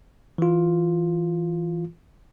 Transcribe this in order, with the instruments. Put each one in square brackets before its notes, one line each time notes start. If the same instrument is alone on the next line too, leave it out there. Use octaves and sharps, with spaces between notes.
[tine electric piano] E3 F4